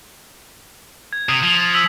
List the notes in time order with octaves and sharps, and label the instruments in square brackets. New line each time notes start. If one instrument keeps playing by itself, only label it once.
[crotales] G#6
[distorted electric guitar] C3 [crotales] D#6
[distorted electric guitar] F3
[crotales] E6 B6 F#7